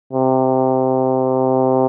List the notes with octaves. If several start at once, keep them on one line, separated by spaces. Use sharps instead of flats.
C3